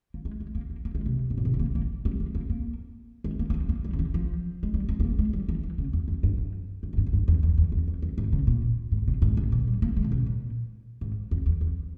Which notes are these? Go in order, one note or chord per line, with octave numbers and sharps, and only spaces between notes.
A#3
G#3
G#3
A#3
A#3
A#3
G#3
C3
G#2
A#2
C3
C4
A#3
A#3
G3
G#3
A#3
A#3
G#3
A#3
A#3
C4
A#3
G3
C#3
E3
F3
G#3
G3
G#3
C4
A#3
G#3
G3
E3
E3
C#3
F2
F2
G2
F2
G2
G#2
G2
F2
G2
E2
E2
E2
F2
E2
F2
G#2
C#3
A#2
G#2
C3
G#2
G#2
A#2
G3
A#3
G#3
A#2
C3
A#2
G#2
F2
E2
F2